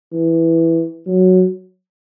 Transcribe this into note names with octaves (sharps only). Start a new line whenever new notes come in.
E3
F#3